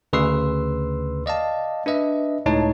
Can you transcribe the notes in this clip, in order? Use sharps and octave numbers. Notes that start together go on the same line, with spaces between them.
D2 C#3 B4 C6 E6 C7
D5 D#5 F5 A5
D4 B4 D#5 E5
C#2 A2 D#4 C#5 A5